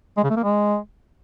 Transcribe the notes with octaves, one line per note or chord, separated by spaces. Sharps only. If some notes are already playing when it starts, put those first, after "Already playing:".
G#3
C#3
A3
A#3
G#3